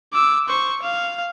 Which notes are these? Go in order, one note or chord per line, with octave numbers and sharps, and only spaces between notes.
D6 E6
C5 C#6
F5